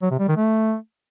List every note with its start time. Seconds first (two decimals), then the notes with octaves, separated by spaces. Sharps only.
0.02 F#3
0.11 C3
0.19 G3
0.28 D#3
0.37 A3